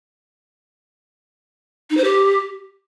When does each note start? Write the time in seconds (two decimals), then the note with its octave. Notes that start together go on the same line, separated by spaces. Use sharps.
1.90 D#4
1.97 C5
2.04 G4